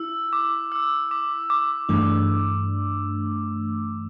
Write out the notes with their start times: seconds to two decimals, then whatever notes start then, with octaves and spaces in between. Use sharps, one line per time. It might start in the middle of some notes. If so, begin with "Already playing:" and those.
Already playing: E4 E6
0.33 D6
0.72 E6
1.11 D6
1.50 D6
1.89 G2 E3 A3 D4